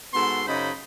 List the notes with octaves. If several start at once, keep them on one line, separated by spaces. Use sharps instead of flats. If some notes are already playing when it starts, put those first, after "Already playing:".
G#2 B3 F#4 A4 C6
F#2 C#3 D#4 C5 D#5 B5